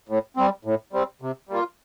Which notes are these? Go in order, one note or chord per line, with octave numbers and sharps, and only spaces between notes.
A2
G3 C4
A2
G3 C4
C3
G3 A#3 F4